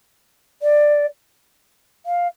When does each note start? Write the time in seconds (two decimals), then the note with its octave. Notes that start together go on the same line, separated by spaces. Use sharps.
0.62 D5
2.06 F5